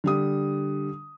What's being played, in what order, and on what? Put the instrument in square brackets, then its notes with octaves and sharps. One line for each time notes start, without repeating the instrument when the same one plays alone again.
[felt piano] D3 G3 D#6